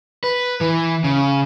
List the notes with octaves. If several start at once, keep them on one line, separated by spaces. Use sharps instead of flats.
B4
E3
C#3